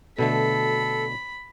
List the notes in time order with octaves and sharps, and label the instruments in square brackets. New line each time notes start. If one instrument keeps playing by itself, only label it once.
[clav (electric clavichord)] B2 D3 A3 [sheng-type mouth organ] A4 [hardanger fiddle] B5